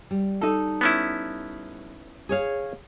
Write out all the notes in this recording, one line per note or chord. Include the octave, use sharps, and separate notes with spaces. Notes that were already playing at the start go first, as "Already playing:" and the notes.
G3
D#4 A4
B3 C#4 E4
G#4 C#5 F5